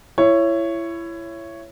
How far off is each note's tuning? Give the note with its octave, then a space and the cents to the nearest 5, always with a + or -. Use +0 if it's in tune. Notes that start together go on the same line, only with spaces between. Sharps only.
E4 +25 C#5 +0